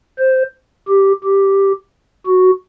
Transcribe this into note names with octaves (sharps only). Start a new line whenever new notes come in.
C5
G4
G4
F#4